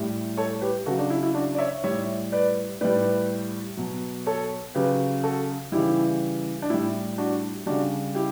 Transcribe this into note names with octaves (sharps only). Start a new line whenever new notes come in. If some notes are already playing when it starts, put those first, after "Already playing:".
Already playing: A2 G3
A4 C#5
G4 B4
C#3 F#3 F#4 A4
D4 F#4
E4
E4
D4 F#4
D5
C#5 E5
A2 G3 C#5 E5
B4 D5
A2 G3 B4 D5
B2 F#3
A4 C#5
C#3 F#3 G4 B4
F#4 A4
C#3 E3 G3 E4 G4
D4
A2 G3 E4
D4 F#4
C#3 G3 D4 F#4
E4 G4